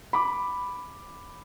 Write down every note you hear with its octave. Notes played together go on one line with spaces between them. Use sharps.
B5 D6